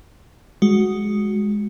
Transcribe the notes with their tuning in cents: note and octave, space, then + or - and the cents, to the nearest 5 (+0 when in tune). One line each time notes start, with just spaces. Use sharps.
G#3 +0 F#4 +0